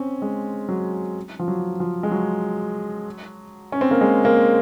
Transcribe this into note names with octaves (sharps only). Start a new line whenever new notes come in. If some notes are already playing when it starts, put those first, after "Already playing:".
Already playing: C4 C#4
G#3
F#3
F3
F#3
F3
G#3
F#3
C#4
C4
A#3
G#3
A#3